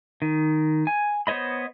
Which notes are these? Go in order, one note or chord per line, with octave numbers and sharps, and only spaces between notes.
D#3
G#5
B3 C5 C#5 D#5 B5